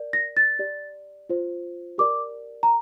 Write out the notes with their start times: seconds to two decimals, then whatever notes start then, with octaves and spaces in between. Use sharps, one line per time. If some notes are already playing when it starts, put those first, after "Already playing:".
Already playing: A#4 D5
0.13 A#6
0.37 A6
0.59 G4 D5
1.29 F4 C5
1.98 G4 A#4 D5 D6
2.63 A#5